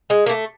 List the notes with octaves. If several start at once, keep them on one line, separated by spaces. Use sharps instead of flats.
G#3
A#3
A3